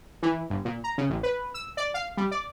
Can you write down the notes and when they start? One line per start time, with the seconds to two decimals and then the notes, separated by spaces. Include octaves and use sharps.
0.22 E3
0.50 G1
0.65 A#2
0.84 A#5
0.98 C#3
1.10 A1
1.23 B4
1.54 E6
1.77 D5
1.94 F5
2.17 G3
2.31 D5